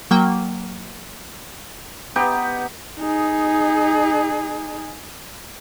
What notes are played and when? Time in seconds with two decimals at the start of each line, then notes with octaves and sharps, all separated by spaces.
0.11 F#3 A#3 G5
2.16 B3 D#4 G4
3.00 D#4 G#4